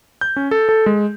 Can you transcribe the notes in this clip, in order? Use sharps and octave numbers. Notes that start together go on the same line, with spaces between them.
G6
C#4
A4
A4
G#3